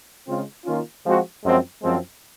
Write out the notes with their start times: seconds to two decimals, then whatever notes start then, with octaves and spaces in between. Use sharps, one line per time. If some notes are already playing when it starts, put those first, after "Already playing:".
0.27 C#3 G#3 C4 F4
0.66 D#3 A#3 C#4 F4
1.05 F3 G#3 C4 F#4
1.43 F#2 F3 G#3 C4
1.82 F#2 F3 G#3 C4